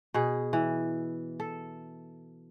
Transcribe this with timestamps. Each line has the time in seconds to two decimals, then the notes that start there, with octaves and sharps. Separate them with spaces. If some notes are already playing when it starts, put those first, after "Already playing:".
0.14 B2 G#4
0.53 E3
1.40 A4